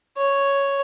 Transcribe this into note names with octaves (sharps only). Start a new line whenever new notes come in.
C#5